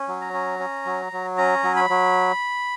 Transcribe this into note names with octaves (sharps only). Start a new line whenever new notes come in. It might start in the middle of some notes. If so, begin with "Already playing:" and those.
Already playing: C#4
F#3
A#5
C#4
C#4
F#3
F#3
C#4 A#5
F#3
B5
F#3